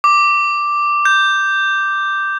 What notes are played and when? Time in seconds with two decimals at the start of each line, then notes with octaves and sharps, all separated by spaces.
0.04 D6
1.05 G6